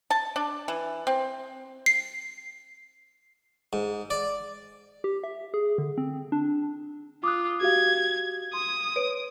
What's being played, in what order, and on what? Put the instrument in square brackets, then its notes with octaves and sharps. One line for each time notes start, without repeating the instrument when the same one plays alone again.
[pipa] A5
D4
E3
C4
[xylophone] C7
[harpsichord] G#2
D5
[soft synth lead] G4
E5
G#4
D3
C4
D4
[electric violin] F4 [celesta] D6 D#6 F#6
[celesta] F#4 G4 F5 [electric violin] G#6
[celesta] C6 [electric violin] D#6
[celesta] B4 C#5 D7